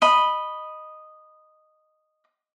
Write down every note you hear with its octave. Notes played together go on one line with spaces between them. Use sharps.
D#5 B5